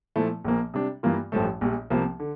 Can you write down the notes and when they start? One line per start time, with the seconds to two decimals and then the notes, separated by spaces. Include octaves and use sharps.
0.16 A#2 F3 A3 E4
0.44 A#1 A#2 F3 A#3
0.74 C3 G3 D4
1.03 G2 E3 A#3 F4
1.32 A1 G2 F3 A3
1.61 A#1 A#2 G3
1.90 C2 C3 F3 A#3
2.19 D3